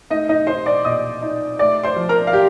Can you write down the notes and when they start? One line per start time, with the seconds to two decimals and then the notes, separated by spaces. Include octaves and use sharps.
0.10 A3 D#4 D#5
0.29 D#4 D#5
0.47 D#4 C5 C6
0.66 D5 D6
0.85 A#2 D#5 D#6
1.22 D#4
1.59 A3 D5 D6
1.84 C5 C6
1.96 F3
2.09 A#4 A#5
2.27 F5
2.33 G4